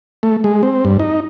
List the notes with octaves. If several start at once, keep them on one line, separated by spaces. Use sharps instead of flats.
A3
G#3
C4
G2
D#4